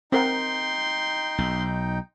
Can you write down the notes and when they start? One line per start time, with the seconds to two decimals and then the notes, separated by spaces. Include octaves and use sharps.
0.12 C4 D#4 A#4 F#5 G5 C6
1.38 B1